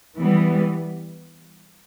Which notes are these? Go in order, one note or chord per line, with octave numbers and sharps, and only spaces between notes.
E3 G3 B3